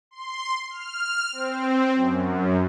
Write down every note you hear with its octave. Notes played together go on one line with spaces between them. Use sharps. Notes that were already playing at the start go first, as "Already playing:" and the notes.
C6
F6
C4
F#2